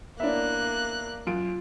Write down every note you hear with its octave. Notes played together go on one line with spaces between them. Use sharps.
A#3 B3 C#4 D4 E4 E5 F#6
F#2 F4 D7